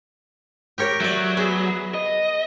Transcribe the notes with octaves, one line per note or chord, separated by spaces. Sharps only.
G4 A#4 C#5
F#3 A3 D5
B3 G#4 E5
D#5